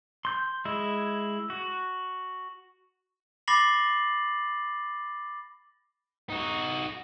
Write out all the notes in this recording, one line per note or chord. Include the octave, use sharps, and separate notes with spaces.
C6 G6
G#3 E4 G#4
F#4
B5 D6 A6 A#6 C7 F#7
D#4 F#4